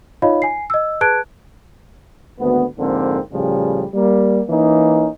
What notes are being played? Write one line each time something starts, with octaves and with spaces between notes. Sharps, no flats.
D#4 F4 C#5 D#5 F5 B5
G#5 C7
D#5 E6
G#4 B4 A5 F#6 G#6 D7
G#1 D2 B3
F2 G#2 D3 A#3 C4
A2 C#3 F3 G3
G3 A#3
E3 A#3 C#4 D#4